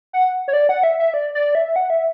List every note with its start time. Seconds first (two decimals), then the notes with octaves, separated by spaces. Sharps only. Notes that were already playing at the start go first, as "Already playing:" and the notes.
0.13 F#5
0.48 C#5
0.53 D5
0.69 F#5
0.84 E5
1.00 E5
1.14 D5
1.35 D5
1.55 E5
1.76 F#5
1.90 E5